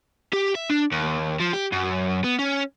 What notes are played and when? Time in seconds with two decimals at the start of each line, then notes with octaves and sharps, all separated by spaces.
0.33 G4
0.55 E5
0.70 D4
0.92 D#2
1.40 F3
1.54 G4
1.72 F#2
2.24 B3
2.39 C#4